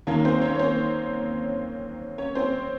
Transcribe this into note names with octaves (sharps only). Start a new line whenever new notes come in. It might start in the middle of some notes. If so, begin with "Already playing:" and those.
D#2 D#3 A#3 C#4 C#5
C4 C5
C#4 C#5
C#5
C4 C5
C#4 C#5
C4 C5